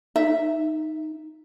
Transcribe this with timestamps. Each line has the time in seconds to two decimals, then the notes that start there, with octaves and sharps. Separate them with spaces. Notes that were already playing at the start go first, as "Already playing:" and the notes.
0.16 D#4 E5